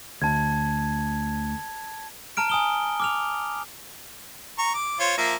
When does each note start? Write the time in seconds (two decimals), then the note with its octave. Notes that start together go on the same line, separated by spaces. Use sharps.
0.22 D2 A5 G#6
2.37 A5 A#5 F6 D7
2.49 G#5 D#6 G7
3.00 D6 F6 F7
4.58 A#5 C#6
4.74 D6
5.00 F4 C5 C#5
5.18 F3 A#3 E5